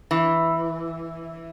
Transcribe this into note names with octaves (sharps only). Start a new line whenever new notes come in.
E3